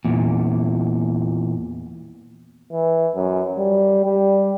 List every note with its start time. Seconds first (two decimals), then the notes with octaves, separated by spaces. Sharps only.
0.05 E2 A#2
2.72 E3
3.15 F#2
3.58 G3
4.04 G3